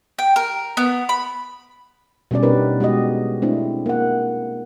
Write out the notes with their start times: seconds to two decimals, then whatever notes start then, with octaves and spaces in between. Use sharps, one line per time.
0.19 G5
0.36 A#4
0.77 B3
1.09 B5
2.31 B2 G3 C#4 D5
2.43 B3 D4 D#4 G4 A#4 B4
2.80 G#3 F#4 G4 D#5
3.42 A3 C4 D4 E4
3.86 A#3 F#5